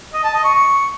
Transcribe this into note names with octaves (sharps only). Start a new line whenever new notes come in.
D#5
A5
D#5
C#6
C#6